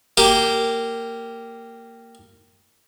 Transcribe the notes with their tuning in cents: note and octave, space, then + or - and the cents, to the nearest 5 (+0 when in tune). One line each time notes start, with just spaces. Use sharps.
A#3 -15 G4 -5